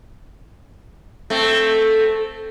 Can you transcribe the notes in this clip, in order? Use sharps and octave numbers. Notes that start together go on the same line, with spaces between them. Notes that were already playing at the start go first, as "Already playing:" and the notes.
A3 C4